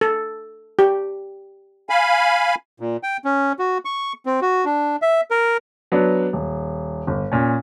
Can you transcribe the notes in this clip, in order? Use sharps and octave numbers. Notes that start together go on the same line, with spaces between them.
A4
G4
F5 G#5 B5
A#2
G5
C#4
F#4
C#6
C4
F#4
D4
E5
A#4
F#3 B3 D4
D#1
G1
A#2 C#4